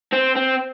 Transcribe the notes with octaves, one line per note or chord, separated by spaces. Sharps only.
C4
C4